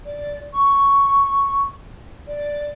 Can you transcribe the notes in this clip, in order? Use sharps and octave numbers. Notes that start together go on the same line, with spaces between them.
D5
C#6
D5